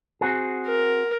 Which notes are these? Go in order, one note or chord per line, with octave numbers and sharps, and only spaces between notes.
C4 F#4 G#4
A#4